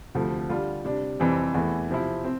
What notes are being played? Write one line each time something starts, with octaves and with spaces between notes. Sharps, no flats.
D2 C3 F3 A3
D3 G3 D4 F4
C3 G3 D4
F2 C3 E3 G3 C4
E2 E3 A3 E4
C3 F3 C4 E4
C4